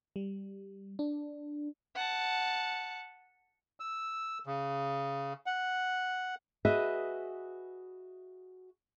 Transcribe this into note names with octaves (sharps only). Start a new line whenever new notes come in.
G3
D4
F#5 A5
E6
C#3
F#5
F#4 G#4 B4 D#5 E5